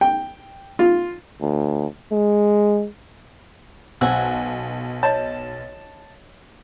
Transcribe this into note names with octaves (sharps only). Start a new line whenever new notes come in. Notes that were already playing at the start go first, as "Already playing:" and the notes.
G5
F4
D2
G#3
B1 C5 F#5 G#5 E6
C#5 D#5 A5